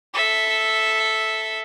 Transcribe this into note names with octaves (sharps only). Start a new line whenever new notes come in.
A4 E5